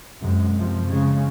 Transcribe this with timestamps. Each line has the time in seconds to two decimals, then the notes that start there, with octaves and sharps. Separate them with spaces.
0.20 F#2 C3 G#3
0.54 C3 F3
0.87 C#3 G#3